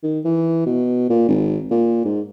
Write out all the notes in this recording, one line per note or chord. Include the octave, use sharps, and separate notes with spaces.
D#3
E3
B2
A#2
G#1
A#2
G#2